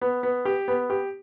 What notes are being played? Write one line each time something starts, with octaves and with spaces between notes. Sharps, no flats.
B3
B3
G4
B3
G4